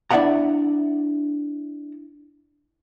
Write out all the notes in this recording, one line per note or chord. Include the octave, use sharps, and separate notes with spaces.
D4 E4 D5 E5 F#5 A#5